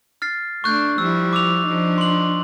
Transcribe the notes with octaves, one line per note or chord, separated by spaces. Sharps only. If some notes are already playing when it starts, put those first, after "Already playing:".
F6 A6 C7
A3 D4 C#6 F#6 G6
F3 G3 E4 E6
D6 E6 F7
F3 D4 D#4
C6 F#7